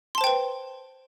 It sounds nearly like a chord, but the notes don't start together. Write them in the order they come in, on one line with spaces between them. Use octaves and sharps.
C6 A5 C5 G5 B4